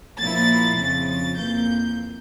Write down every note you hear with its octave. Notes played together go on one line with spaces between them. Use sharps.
A#2 F3 A#3 E4 A6
F2 C#3 F3 A6
A6
F2 E3 A#3 G6